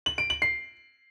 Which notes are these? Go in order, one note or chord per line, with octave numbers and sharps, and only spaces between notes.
F#7
D7
F#7
C7